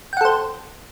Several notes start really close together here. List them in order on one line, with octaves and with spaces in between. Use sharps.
G5 F#5 A4 C5